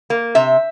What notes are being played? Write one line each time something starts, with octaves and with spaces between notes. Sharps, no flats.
A#3
C3 E5